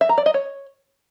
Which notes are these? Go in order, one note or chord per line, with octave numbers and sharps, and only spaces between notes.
E5
A#5
D5
D#5
C#5